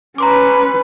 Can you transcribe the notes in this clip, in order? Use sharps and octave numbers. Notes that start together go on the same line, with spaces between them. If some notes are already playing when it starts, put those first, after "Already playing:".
C#4 B4 A#5 C6 D6